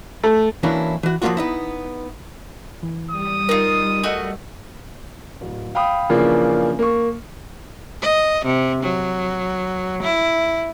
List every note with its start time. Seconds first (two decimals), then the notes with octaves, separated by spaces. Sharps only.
0.23 A3
0.63 E3 F#3 A#3 C#4 D4 E4
1.03 E3 F#4
1.22 F3 F#3 A3 A#3 F4 F#4
1.37 B3 D#4 E4
2.83 E3
3.11 G3 D#6
3.49 D#4 F4 A#4
4.03 A3 F#4 D#5
5.41 D1
5.75 F5 G5 B5 D#6
6.09 C#3 E3 F3 A#3 D4 F4
6.79 A#3 C#6
8.02 D#5
8.45 C3
8.83 F#3
10.03 E4